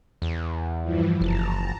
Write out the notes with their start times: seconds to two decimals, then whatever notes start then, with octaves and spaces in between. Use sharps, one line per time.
0.22 E2
0.82 G2 E3 F3
1.21 F#1 A5 A#5